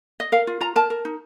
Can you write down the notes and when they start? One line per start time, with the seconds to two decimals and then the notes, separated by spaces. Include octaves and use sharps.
0.20 D#5
0.32 A#4 F5
0.47 F4
0.61 F4 A#5
0.76 A#4 A5
0.90 A#4
1.05 D#4